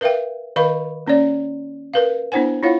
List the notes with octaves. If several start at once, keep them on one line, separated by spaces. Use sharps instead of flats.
A#4 B4 E5 F5 G5
D#3 B4 D#5 F5 B5 C#6
A#3 C#4 C#5 D5
A#4 B4 F5
B3 D4 E4 C5 F#5 G#5
E4 F4 C#5 F5 F#5